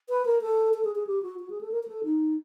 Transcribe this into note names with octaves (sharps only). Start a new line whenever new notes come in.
B4
A#4
A4
A4
G#4
G#4
G4
F#4
F#4
G#4
A4
A#4
A#4
A4
D#4